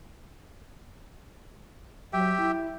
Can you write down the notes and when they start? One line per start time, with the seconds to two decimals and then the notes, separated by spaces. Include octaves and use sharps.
2.13 F#3 G4 E5 G5
2.39 E4